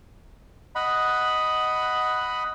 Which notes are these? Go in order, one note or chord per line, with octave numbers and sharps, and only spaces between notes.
D#5 F#5 B5